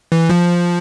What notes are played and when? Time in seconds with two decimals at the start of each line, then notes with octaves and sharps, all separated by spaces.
0.12 E3
0.30 F3